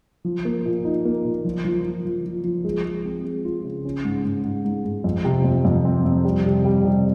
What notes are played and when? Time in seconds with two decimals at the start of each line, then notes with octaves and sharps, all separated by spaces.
0.25 F3
0.45 A#3
0.65 A#2
0.85 D#4
1.05 A#3
1.25 A#2
1.44 F3
1.65 F3
1.85 F3
2.05 F3
2.25 F3
2.44 F3
2.64 G#3
2.85 G#3
3.05 C4
3.25 G#3
3.45 F4
3.64 C#3
3.85 C#4
4.04 G#2
4.24 G#2
4.44 G#2
4.65 G#2
4.85 G#2
5.04 F2
5.25 C3
5.45 F2
5.65 F2
5.85 C4
6.05 F2
6.24 G3
6.45 C3
6.65 G3
6.84 C3